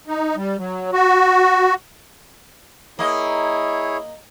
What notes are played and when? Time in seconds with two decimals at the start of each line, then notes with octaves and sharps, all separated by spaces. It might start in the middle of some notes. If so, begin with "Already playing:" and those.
0.07 D#4
0.36 G3
0.58 F#3
0.92 F#4
2.99 A#3 E4 G#4 C#5 D#5